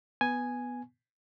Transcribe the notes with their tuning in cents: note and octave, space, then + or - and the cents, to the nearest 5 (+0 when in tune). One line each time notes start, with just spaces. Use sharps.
B3 +0 G#5 +0